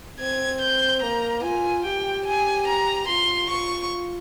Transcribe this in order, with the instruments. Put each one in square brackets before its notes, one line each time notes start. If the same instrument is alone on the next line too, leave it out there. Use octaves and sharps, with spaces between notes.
[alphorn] C4 [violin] G#6
[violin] G6
[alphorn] A#3 [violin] A#5
[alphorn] F4 [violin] G#5
[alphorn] G4 [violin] G5
[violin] G#5
A#5
[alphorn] F4 [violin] C6
[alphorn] F4 [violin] C#6